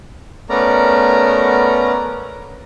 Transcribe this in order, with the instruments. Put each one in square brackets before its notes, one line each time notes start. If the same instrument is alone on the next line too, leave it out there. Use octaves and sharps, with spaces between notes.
[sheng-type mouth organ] A3 B3 C#4 A#4 D5 A#5